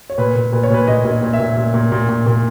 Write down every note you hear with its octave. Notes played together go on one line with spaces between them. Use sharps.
C#5
A#2 B4
A#2
A#2 B4
C#5
A#2 B4
A#2 D#5
A#2
D#5
A#2
E5
A#2
A#2
A#2
A#2
A#2
A#2